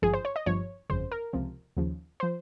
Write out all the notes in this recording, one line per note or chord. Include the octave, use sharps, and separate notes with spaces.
G#1 G2 F3 G#4
C5
C#5
D#5
G1 G2 F3 C#5
G1 F2 C#3 C5
A#4
C#2 C3 F3
D#2 C#3 F3
F3 C5